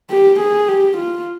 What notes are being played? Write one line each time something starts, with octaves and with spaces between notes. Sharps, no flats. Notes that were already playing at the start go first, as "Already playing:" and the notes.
G4
G#4
G4
F4